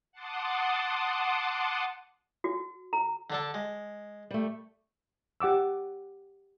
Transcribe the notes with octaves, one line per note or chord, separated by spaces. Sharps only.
F#5 A5 C6 D6 D#6
F#4
A#5
D3 D4 A4
G#3
G3 A3
G4 F#5 D6 E6